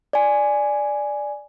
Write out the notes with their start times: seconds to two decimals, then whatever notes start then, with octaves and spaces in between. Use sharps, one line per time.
0.13 D5 G#5